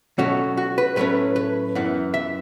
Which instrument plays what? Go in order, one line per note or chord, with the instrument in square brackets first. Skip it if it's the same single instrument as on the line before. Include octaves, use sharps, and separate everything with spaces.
[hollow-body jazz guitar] B2 F#3 A3 C#4 F#4
F#4
B4
A2 F#3 A3 C#4 B4
B4
F#2 E3 B3
E5